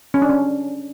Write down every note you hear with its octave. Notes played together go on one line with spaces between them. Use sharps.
C#4
D4
C#4